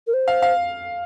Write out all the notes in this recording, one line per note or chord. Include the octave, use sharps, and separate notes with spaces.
A#4
C5
F5
F5